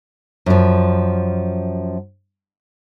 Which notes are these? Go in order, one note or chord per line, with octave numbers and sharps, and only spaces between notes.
F#2 F3